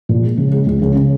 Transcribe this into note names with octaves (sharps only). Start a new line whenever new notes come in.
A#2
G#3
C#3
G#3
C#2
C#3
C#3